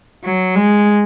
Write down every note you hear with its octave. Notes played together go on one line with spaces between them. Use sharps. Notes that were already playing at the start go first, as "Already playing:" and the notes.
F#3
G#3